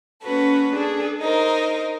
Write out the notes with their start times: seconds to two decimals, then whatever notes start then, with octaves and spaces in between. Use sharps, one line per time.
0.22 A#3 C#4 F#4 A4 B4
0.72 D4 G#4 A4
1.20 D#4 A#4 C5